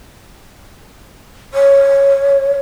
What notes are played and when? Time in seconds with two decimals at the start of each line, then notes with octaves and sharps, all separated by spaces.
1.54 C#5